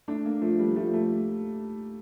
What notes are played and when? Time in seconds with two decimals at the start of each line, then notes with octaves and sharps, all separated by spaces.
0.08 A3 D4
0.25 A#3
0.41 F3 A3
0.59 G3
0.76 F3 A3
0.94 A3